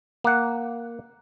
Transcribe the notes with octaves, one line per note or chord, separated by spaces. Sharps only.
A#3 F#5